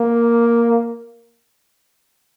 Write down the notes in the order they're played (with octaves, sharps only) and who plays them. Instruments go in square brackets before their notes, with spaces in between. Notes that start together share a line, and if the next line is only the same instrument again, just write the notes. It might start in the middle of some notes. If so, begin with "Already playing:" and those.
Already playing: [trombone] A#3